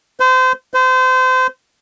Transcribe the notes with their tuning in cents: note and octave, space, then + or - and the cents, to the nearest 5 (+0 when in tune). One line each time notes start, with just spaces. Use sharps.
C5 -30
C5 -30